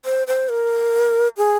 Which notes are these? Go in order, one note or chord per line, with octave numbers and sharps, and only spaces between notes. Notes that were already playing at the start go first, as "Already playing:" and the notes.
C5
C5
A#4
G#4